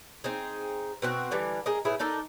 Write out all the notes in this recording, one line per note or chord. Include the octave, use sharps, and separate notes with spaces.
C4 D#4 G#4
B2 C4 F#4
D3 E3 G3
G#4 A#4 D#5
A2 B3 E4 G#4
D4 D#4 A4 A#4